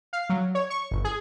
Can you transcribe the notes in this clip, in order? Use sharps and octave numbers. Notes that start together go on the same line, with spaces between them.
F5
F#3
C#5
C#6
G1
G#4